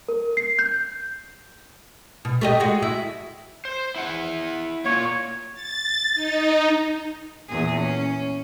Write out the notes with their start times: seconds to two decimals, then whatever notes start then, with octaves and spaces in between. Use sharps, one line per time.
0.09 A#4
0.37 C7
0.59 G6
2.25 B2
2.41 A3 G4 D#5
2.60 G#3 F#4
2.82 E4
3.65 C5
3.96 E4 F#5
4.85 A#3 F4 C#5
5.54 A6
6.14 D#4
7.48 E2 A#2 G#4
7.79 C#4